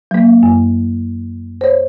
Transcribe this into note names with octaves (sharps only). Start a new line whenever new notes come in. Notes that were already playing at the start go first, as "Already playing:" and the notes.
F#3 A#3
F#2
C5 C#5